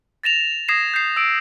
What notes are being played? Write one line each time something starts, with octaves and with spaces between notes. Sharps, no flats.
A6 A#6 E7 F7
D#6 G#6 A#6 C7 E7 F7
G6 C7
E6 D7